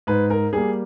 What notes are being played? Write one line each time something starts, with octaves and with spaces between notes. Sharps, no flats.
G#2 B4
A#4
G3 A#3 G#4